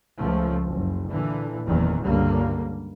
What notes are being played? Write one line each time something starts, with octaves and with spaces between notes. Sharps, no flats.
C#2 F3 A3
F#1
A#2 D3 E3
F#1 E2 A#2 D#3 E3
C#2 G2 D3 G3 A#3